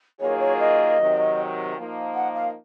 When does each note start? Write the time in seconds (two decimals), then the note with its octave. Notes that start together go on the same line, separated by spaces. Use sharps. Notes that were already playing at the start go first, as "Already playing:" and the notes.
0.20 D#3 F#3 A#3 F4 G#4 C#5
0.40 C#5
0.59 D#5
0.98 C3 D#3 F#3
1.76 F3 A#3 D#4
2.15 F#5
2.34 F5